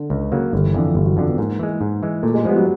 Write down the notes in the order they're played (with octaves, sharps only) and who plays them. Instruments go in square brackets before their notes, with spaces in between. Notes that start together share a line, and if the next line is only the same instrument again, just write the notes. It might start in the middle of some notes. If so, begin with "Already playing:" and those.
Already playing: [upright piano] D3
[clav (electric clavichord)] C#2
C#3 F#3 A#3
[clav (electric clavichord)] G1 [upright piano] D#3
[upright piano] E3
[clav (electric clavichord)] F2 D3 [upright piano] E3
[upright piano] F3
[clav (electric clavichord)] G1 [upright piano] F3
[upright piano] F#3
[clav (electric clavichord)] F2 D3 [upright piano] F3
[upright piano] B3
[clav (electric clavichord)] G#2 [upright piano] A#3
[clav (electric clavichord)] E3 G#3
G#2
E3 G#3
[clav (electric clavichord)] A#2 [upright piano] A3
[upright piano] G#3
[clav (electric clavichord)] F3 G#3 B3 [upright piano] G3
[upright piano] F#3